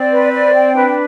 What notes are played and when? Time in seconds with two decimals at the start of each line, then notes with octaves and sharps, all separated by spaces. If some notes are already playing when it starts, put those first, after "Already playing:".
Already playing: C4 D5
0.12 B4
0.33 D5
0.54 G5
0.74 D4 B4